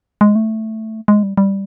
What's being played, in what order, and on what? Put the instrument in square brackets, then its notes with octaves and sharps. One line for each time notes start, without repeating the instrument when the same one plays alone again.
[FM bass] G#3
A3
G#3
G3
G3